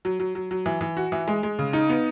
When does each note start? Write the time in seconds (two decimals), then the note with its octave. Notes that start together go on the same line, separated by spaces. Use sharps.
0.05 F#3
0.20 F#3
0.35 F#3
0.51 F#3
0.66 E3
0.81 E3
0.97 F#4
1.12 E3
1.28 G#3
1.43 G#3
1.59 C#3
1.73 D#4
1.90 B3